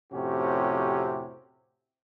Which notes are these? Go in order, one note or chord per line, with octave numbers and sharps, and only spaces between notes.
F2 A2 C3 C#4 F#4 G4